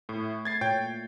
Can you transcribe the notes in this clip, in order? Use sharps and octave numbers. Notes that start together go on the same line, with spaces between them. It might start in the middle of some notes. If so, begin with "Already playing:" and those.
A2 A3
G#6 A6 C7
A#2 C#5 G5 G6